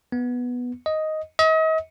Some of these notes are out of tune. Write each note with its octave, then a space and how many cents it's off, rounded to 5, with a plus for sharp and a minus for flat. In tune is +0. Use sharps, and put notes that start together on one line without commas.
B3 -5
D#5 +5
D#5 +40